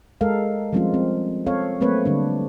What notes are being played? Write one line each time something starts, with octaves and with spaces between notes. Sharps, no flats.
G#3 A4 A#4 F5
F3 G3 G#3 C4 C#4 F4
C4
C4 A4 C#5 F5
F#3 A3 A#3 C4 B4 C#5
D3 G3 D4